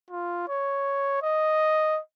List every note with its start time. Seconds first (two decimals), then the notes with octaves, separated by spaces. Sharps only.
0.11 F4
0.49 C#5
1.23 D#5